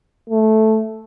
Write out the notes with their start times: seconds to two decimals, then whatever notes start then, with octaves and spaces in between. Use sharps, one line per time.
0.30 A3